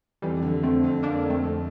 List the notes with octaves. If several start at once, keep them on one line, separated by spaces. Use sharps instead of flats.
F2 E3 G3
D3
F2 A3 C4
F2
F2 A#3 D4
F2
A3 C4
F2